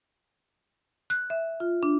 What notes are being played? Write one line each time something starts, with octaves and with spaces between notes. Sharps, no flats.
F#6
E5
F4
D4